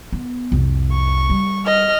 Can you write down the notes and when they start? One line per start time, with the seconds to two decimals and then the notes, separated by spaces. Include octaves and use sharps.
0.12 B3
0.52 C2 F2
0.92 C#6
1.30 G3
1.66 D#5 F6